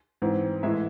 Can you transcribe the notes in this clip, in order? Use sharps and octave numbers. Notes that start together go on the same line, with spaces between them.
G#2 E3 C4
A2 E3 G#3 E5